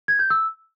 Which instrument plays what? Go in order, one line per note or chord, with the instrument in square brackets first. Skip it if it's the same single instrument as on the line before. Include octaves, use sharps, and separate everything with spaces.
[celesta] G#6
G6
E6